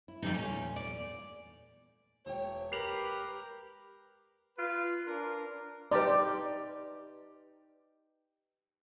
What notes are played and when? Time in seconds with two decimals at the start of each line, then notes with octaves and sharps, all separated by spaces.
0.08 E4
0.22 F2 D3 E3 G3 D4 D#4
0.34 E2 A#2 A3 C#4
0.76 D5
2.26 E1 C#5 G5
2.72 G4 A#4 B4 C7 F7 F#7
4.58 F4 B4
5.06 D4 F4 A#4
5.92 D#4 G4 B4 D5 C6